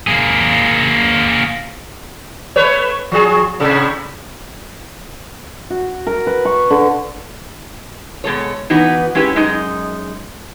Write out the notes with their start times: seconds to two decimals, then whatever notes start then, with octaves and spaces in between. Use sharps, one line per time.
0.07 A#3 G#4
2.56 A3 B4 C#5
3.12 F3 G#4
3.60 A2 C3 A4
5.70 F#4
6.07 A#4
6.27 B4
6.45 C#6
6.70 D3
8.24 B2 G#3 A4 C#5
8.70 E3 B3 D#4 F#4 B4
9.15 G#3 C#4 E4 G4 B4
9.36 F#2 G#3 D#4 D#5